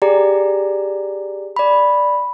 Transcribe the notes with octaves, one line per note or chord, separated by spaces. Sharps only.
G4 G#4 D5 A#5
D5 B5